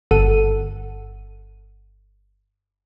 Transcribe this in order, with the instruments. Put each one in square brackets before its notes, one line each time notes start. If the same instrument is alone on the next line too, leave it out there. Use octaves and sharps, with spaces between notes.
[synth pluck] G1 A4 F#5 D#7